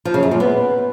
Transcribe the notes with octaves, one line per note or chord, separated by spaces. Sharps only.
F3
C#3
F#2
A#2
B3